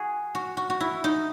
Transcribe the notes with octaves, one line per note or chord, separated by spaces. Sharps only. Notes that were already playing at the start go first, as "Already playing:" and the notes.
Already playing: F#4 G#4
F#4
F#4
F#4
E4
D#4